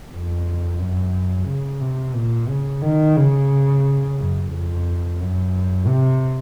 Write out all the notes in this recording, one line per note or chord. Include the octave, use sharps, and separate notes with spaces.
F2
F#2
C#3
C3
A#2
C#3
D#3
C#3
F#2
F2
F#2
C3